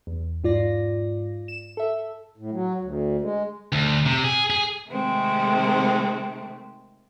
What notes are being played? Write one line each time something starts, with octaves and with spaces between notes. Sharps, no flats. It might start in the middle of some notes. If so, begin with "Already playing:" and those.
E2
G#2 F4 D5 A#6
E7
A4 E5
A2
F#3
D2
G#3
D2
C3
G#4
G#4
C3 D#3 G#3 A3 C4